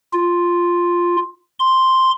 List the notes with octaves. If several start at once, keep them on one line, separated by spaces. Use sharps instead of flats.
F4
C6